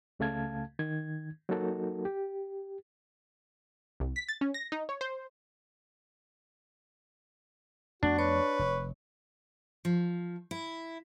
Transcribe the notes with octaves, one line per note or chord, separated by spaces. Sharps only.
C#2 C#3 A3 F5 A5 G#6
D#3 G#6
F#3 A#3 D#4 F#4 A4 A#4
G4
C2
B6
A6
C#4
A#6
D#4
C#5
C5
F2 A3 B3 D4 F#4
B4 C#5 C#6
F1
F3
E4